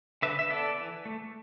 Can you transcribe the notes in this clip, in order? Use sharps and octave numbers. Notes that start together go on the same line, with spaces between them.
D3 B4 E5
E5
B3 A4 D5
E3
A3